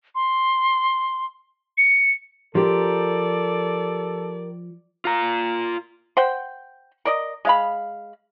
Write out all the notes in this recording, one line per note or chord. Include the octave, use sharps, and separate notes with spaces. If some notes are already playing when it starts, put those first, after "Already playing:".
C6
C#7
F3 G4 A4 A#4 D5
F4 A#5
C5 F#5 G5
A#4 D5 D#5
G#3 F5 B5